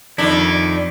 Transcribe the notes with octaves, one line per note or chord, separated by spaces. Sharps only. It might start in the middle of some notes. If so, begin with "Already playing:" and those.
F2 D#3 D4 E4